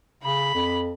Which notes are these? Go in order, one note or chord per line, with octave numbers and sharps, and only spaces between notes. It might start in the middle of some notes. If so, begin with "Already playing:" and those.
C#3 B5
F2